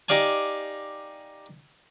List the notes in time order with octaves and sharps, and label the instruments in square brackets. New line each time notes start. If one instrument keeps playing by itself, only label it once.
[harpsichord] D#4 G4 D5 F5 G#5